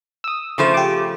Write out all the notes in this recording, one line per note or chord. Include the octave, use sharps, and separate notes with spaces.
D#6 E6
C#3 F3 A3 C5 C#6
G4 D6